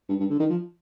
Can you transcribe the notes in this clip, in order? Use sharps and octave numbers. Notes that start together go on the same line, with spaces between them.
G2
G2
D3
D#3
F3